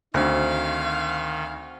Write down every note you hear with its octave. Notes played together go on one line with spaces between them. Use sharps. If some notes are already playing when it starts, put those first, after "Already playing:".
D2 D#3 C4 F#4 F5